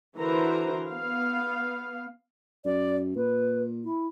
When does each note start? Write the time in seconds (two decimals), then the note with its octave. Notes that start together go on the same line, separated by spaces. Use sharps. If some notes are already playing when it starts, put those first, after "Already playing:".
0.17 D3 E3 F#4 A#4 C5 A#5
0.89 B3 F5
2.65 F#2 D5
3.16 A#2 B4
3.84 E4